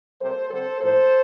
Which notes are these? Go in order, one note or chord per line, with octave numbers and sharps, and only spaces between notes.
C3 G3 A#3 A4 C5
D3 G3 C4 A4 C5
A2 F3 A#3 A4 C5